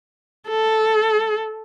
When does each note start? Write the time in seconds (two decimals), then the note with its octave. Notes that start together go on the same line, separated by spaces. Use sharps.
0.49 A4